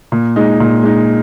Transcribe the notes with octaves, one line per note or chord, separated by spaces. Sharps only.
A#2
G#3 D#4
A#2
G#3 D#4